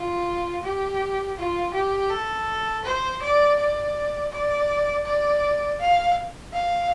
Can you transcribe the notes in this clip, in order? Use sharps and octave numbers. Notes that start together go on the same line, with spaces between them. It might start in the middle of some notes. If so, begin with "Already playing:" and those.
Already playing: F4
G4
F4
G4
A4
C5
D5
D5
D5
D5
F5
F5